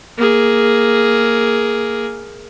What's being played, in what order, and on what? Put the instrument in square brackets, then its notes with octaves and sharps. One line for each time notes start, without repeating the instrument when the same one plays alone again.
[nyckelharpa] A#3 G#4